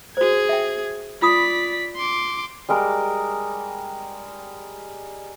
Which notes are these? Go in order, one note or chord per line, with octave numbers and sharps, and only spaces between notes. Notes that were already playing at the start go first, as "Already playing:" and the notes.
F#4 G#4 C5 G#6
E5 G5
F4 D5 B5 D#6 B6
C6 D6
G3 G#3 A#4 D6